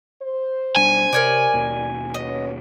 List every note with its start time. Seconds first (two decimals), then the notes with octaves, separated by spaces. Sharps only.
0.22 C5
0.76 B1 G3 D4 G#5
1.13 C3 A#4 C#5 D5
1.54 D#2 B2
2.14 B3 C#4 C#5 D#5